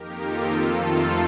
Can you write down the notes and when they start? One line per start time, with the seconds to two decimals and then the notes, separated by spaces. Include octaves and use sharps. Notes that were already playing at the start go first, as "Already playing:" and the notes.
Already playing: F2 D#3 A#3 D#4 G4 A#4
0.21 F4 A4
0.52 F2 D#3 A3 C4